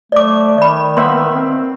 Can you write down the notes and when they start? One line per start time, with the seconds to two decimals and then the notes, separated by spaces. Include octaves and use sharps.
0.12 A3 D5 D6
0.58 D#3 D5 B5
0.97 A#3 B3 E5 C6
1.34 C4